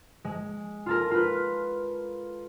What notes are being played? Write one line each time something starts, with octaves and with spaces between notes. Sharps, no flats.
G#3
F4 A4 A#4
F4 B4